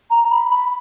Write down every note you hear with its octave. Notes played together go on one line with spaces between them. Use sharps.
A#5
B5
B5